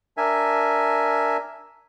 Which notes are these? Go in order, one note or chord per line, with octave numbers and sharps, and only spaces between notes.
D4 A#4 E5 G#5